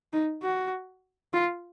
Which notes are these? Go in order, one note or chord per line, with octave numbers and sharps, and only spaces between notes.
D#4
F#4
F4